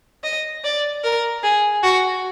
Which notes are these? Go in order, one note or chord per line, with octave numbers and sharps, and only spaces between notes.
D#5
D5
A#4
G#4
F#4